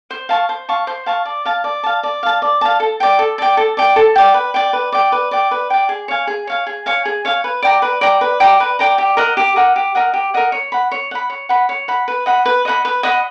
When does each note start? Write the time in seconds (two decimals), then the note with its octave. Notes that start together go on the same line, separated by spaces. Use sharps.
0.11 C5
0.29 F5 A5 C#6
0.49 C5
0.69 F5 A5 C#6
0.87 C5
1.06 F5 A5 C#6
1.25 D5
1.45 F5 A5
1.64 D5
1.83 F5 A5
2.03 D5
2.23 F5 A5
2.42 D5
2.61 F5 A5
2.80 A4
3.00 D5 G5
3.19 A4
3.38 D5 G5
3.57 A4
3.77 D5 G5
3.96 A4
4.16 D5 G5
4.34 B4
4.54 D5 G5
4.73 B4
4.92 D5 G5
5.12 B4
5.31 D5 G5
5.51 B4
5.70 D5 G5
5.89 G#4
6.08 C#5 F5 G#5
6.27 G#4
6.47 C#5 F5 G#5
6.67 G#4
6.86 C#5 F5 G#5
7.05 G#4
7.25 C#5 F5 G#5
7.44 B4
7.62 D5 G5 A#5
7.82 B4
8.01 D5 G5 A#5
8.21 B4
8.40 D5 G5 A#5
8.60 B4
8.79 D5 G5 A#5
8.98 G4
9.17 A#4 D#5 F#5
9.37 G4
9.56 A#4 D#5 F#5
9.76 G4
9.95 A#4 D#5 F#5
10.13 G4
10.34 A#4 D#5 F#5
10.52 C#5
10.72 F#5 B5
10.91 C#5
11.11 F#5 B5
11.30 C#5
11.49 F#5 B5
11.69 C#5
11.88 F#5 B5
12.08 B4
12.26 D#5 F#5 B5
12.46 B4
12.65 D#5 F#5 B5
12.85 B4
13.03 D#5 F#5 B5